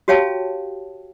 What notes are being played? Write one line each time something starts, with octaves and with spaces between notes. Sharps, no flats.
F#4 G4 C#5 F5 G5 A5